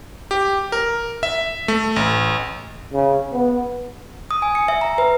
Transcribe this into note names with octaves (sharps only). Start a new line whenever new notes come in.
G4
A#4
E5
A3
A1
C#3
B3
D#6
G#5
C#7
E5
A#5
B4